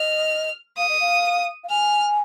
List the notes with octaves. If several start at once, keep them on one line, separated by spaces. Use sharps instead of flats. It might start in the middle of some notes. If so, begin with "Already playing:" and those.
Already playing: D#5 F6
F5 D#6
D#5
F5
F5
G#5 F6